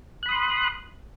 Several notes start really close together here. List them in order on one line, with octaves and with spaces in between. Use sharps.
F#6 B5 D#6 C6